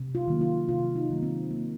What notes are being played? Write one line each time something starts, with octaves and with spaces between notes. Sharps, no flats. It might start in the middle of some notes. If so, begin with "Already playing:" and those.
Already playing: C3
F4
D#3 F#3 A#3
F4
C3 F4
D#4
D#3 F#3 A#3
C4
C3 A#3